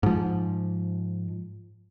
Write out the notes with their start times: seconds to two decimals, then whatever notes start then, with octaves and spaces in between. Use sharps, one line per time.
0.03 G#2 F3